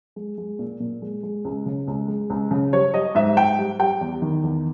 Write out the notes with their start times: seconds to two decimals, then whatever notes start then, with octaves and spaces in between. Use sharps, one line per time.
0.16 G#3
0.38 G#3
0.59 A#2
0.80 A#2
1.02 G#3
1.23 G#3
1.45 C#2
1.66 C#3
1.87 C#2
2.08 G#3
2.30 C#2
2.51 C#3
2.73 G3 C#5
2.94 G3 D#5
3.15 G#2 E5
3.36 G#2 G5
3.58 G3
3.79 G3 G5
4.01 E2
4.22 D#3
4.43 E2